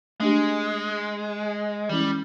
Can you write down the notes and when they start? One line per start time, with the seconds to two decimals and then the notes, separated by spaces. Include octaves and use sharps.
0.20 G#3 A3 D4 G4
1.89 E3 G3 G#3 C#4 E4